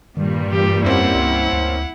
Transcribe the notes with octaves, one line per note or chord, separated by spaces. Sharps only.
G2 A#2 D#3 G3
E3 G4
F2 A#3 C4 C#4 E4 F#5
C#2
D2